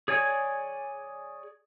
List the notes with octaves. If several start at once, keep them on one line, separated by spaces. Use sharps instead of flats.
G#4 C#5 D5 G#5